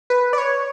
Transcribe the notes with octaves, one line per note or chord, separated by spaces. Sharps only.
B4
D5
C#5